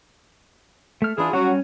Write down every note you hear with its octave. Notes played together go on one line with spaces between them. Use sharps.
A3 F6
E3 D4 E4 F4 G#4
F#3 G3 C#4 F#4